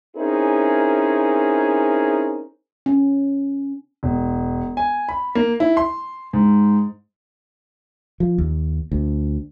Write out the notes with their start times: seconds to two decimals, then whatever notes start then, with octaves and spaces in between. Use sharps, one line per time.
0.16 C4 C#4 D#4 E4 G#4 A#4
2.86 C#4
4.03 E1
4.77 G#5
5.09 B5
5.35 A#3
5.60 E4
5.77 C6
6.33 G#2
8.20 F3
8.38 D#2
8.92 D2